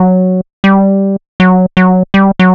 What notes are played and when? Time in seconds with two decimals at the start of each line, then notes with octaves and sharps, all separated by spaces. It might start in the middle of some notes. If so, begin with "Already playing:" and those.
Already playing: F#3
0.64 G3
1.40 F#3
1.77 F#3
2.14 G3
2.39 F#3